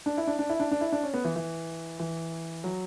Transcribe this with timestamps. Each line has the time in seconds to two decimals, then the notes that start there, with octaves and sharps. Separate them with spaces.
0.06 D4
0.18 E4
0.27 D4
0.39 D4
0.50 E4
0.60 D4
0.71 D4
0.81 E4
0.92 D4
1.03 C#4
1.14 B3
1.24 E3
1.36 E3
1.99 E3
2.64 F#3